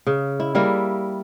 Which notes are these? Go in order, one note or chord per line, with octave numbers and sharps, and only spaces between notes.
C#3
E4
G3 A#3 E4 A#4